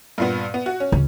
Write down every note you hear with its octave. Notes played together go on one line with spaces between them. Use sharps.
G2 A#2 B3
B3
F#4
C#4
C#2